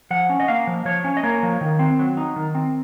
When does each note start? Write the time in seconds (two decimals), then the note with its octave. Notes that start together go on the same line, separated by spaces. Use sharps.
0.11 F3 F#5
0.29 C#4
0.40 D#5
0.48 A#3 F5
0.67 F3
0.85 F3 C#5
1.04 C#4
1.17 D#5
1.23 A#3 C#5
1.43 F3
1.61 D#3
1.79 C4
1.99 F#3
2.17 D#4
2.36 D#3
2.55 C4